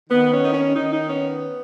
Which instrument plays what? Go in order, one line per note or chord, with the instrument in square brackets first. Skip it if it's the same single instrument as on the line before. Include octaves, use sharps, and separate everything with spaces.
[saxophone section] D#3 B3
C#4
D#3 D#4
C#4
D#3 D#4
D#4
B3 C#4